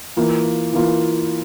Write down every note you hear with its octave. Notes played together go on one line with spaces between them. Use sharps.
E3 A#3 F4
E3 A#3 F4